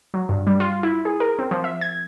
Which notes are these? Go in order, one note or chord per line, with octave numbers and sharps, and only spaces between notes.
F#3
G2
G3
F4
E4
G#4
A#4
C4
F3
E5
G#6